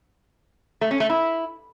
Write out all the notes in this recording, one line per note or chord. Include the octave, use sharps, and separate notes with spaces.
A3
C#4
A3
E4